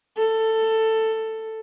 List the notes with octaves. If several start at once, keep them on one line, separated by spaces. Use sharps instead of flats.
A4